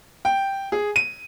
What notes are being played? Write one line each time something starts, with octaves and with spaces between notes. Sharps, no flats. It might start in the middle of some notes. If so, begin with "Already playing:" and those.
G5
G#4
D#7